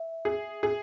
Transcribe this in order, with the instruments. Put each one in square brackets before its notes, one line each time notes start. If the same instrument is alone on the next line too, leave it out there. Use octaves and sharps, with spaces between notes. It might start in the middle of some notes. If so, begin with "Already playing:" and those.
Already playing: [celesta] E5
[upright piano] G#4
G#4